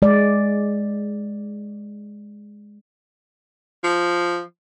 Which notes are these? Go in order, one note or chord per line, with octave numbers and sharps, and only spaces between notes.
G#3 D5
F3